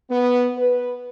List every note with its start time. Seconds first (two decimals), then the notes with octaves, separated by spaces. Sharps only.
0.10 B3
0.57 B4